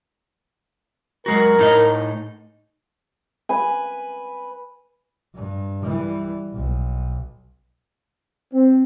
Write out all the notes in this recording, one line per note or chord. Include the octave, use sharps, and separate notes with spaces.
F#2 G#3 F#4 A#4
A2 D#4 D#5
B4 G#5
G2
E3 G3
B1
C4